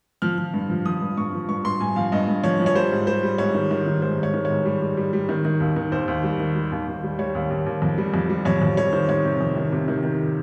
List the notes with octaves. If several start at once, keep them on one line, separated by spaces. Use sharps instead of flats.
F3 F6
F3
G2
F3
F3 D#6
G2
G2 C#6
F3
G2 C#6
G2 C6
G2 G#5
F3 F5
G2 D#5
G2
F3 C#5
F3
C#5
G3 C5
G#2
G3 C5
G3
G#2 C#5
D#3
D#3
D#3
G#2 C5
G#2
C#5
D#3
G#2 C#5
G3
G3
G3
G3
D#3
D#3
D#2
D#3
D#2 C5
D#2
G3
D#3
G3
D#2
D#2
G3
G3 C#5
D#2
D#2
D#2
F2
G3
F2
G3
F2 C#5
F2
G3 C#5
D#3 C5
D#3 C#5
C3
F2
D#3
C3
D#3
D#3